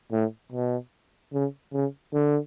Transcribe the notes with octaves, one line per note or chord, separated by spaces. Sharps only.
A2
B2
C#3
C#3
D3